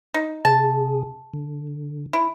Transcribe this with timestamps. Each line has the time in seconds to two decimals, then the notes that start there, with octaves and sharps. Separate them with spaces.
0.14 D#4
0.45 C3 G#4 A5
1.34 D3
2.13 E4